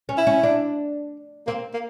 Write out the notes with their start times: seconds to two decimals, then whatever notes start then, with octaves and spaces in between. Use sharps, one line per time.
0.09 C#4
0.18 E4
0.27 C#4
0.43 D4
1.47 A#3 C4
1.74 A#3